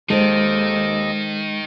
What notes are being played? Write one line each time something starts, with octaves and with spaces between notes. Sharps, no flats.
D#2 D#3 G#3 A4 C5 D#5